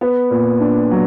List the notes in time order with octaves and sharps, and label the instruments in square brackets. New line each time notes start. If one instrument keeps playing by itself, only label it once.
[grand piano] B3
A#2
D4
F#3